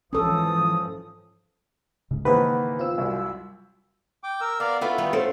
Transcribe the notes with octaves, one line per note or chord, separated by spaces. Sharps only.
G#2 E3 F3 C#4 A4 D#6
G#2 C#3
D#3 E3 A#3 G#4 B4 C5 F#5
C4 F4 E6
C2 F#2
G5 D6
A#4 E6
B3 A#4 D5 F5
A3 B3 E4 F4
D#3 G3 B4
C4 C#4 A4